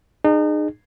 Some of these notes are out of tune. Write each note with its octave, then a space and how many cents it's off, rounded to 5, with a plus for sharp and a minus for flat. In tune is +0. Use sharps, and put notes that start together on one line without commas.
D#4 -35 G#4 +0